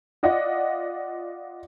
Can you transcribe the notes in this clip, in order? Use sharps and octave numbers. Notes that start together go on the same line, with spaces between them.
F4 D5 D#5 F#5